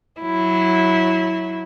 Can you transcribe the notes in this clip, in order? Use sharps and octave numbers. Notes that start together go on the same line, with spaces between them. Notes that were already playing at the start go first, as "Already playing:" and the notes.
F#3 E4